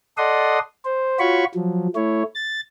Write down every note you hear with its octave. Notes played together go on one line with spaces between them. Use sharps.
A4 D5 D#5 F#5 C6 D#6
C5
F4 F#4 C#5 B5 C#6
F3 F#3
A3 E4 C#5
A6